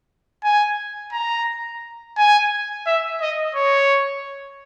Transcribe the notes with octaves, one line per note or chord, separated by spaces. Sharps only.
G#5
A#5
G#5
E5
D#5
C#5